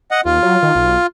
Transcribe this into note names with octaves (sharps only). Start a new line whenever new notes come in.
D#5 F#5
D#2 F4
F#3
D#3
B1